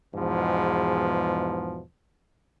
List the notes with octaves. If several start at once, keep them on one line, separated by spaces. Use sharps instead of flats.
E2 G#2 B2 F3